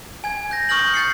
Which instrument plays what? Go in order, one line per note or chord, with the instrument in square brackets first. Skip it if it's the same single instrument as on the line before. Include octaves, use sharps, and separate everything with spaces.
[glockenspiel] G#5 G#6
G6 A#6
C#6 D#6 F6 G6 A#6 F#7
G6 A6 C7 C#7